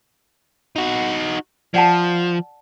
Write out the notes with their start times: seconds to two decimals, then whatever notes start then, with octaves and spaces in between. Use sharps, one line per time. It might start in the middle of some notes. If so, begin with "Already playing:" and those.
0.76 D#4 F#4
1.74 F3 D5 F#5 A5